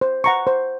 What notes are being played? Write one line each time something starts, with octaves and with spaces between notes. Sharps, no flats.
C5
F#5 A#5 C#6
C5